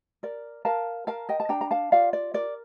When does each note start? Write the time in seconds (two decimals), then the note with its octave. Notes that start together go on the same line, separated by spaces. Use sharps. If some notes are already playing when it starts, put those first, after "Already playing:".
0.23 A#4 D5
0.65 A#4 F5 A5
1.07 A#4 F5 A5
1.29 D#5 G5
1.40 A5
1.49 D4 G5 A#5
1.61 A#5
1.71 F5 A5
1.92 F4 D5 F5
2.13 D5
2.34 A#4 D5